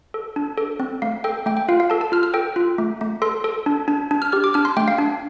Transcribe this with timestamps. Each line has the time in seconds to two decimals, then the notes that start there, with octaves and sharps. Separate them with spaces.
0.14 A4
0.36 D4
0.58 A4
0.80 C4
1.02 A3 F5
1.24 A4 G5
1.46 A3 G5
1.57 G5
1.68 F4 F5
1.80 F5
1.90 A4 A5
2.01 A5
2.12 F4 F6
2.23 F6
2.34 A4 G5
2.56 F4
2.78 A3
3.01 A3
3.22 A4 C6
3.44 A4
3.66 D4
3.88 D4
4.11 D4
4.22 F6
4.32 G4 F6
4.44 D6
4.54 D4 F6
4.65 C6
4.77 A3 G5
4.88 F5
4.98 D4